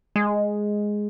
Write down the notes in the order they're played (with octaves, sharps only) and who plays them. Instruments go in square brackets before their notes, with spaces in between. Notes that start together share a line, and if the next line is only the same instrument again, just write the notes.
[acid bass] G#3